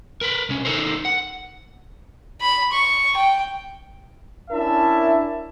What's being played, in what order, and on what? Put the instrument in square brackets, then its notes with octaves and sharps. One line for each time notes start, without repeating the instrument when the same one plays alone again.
[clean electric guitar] A#4 B4
C2 C#4
D#4 A4 A#4 C5
F#5
[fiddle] B5
C#6
G5
[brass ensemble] C#4 D4 E4 A#4 E5 A5